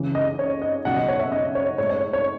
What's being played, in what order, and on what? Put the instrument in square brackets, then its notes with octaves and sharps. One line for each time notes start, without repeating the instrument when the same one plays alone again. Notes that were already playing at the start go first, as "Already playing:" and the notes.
Already playing: [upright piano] C#2 C#3 E3
D#5
C#5
D#5
C#2 B2 F#3 F#5
D#5
C#5
E5
D#5
C#5
A2 G#3 C#5
C#5
C#5